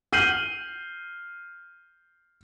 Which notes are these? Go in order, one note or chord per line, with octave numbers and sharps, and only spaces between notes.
F6 G6 C7 D#7 F#7